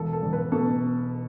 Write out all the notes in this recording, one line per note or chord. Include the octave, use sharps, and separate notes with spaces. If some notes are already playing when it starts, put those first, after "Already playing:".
Already playing: E1 A4
A4
E1
B4
B2 A4